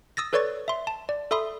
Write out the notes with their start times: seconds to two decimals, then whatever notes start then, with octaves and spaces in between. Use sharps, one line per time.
0.17 D#6 E6 A6 A#6
0.33 A4 B4 C#5 D5 C#6 A6
0.68 E5 C6
0.87 A5
1.09 D5
1.31 A4 E5 B5 C6 D#6